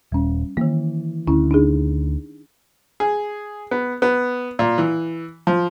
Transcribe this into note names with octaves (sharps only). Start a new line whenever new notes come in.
D#1 G3 C#4
D#3 E3 A#3
D2 D3 C#4 E4
D4 D#4 G#4
G#4
B3
B3
A#2
E3
F3